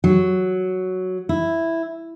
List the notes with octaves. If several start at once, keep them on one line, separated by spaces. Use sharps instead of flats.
F#3
E4